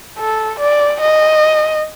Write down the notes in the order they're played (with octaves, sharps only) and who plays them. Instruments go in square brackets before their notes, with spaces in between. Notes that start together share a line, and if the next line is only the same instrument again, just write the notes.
[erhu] A4
D5
D#5